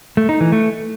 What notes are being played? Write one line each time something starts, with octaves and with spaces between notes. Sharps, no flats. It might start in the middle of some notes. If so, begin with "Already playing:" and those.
A3
D#4
E3
A3